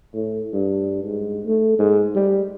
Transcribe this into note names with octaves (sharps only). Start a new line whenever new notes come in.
A2
G2
G#2
A3
G#2
G3